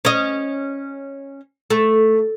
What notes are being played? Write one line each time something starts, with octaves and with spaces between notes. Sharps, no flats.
C#4 D#5
A3